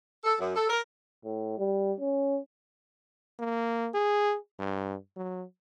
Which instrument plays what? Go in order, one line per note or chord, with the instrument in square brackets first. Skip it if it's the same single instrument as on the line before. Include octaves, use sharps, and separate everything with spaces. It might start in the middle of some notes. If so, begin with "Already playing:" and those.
[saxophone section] A4
F#2
A4
A#4
[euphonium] A2
G3
C#4
[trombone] A#3
G#4
G2
F#3